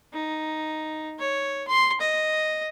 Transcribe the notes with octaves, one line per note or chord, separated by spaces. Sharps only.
D#4
C#5
C6
D#5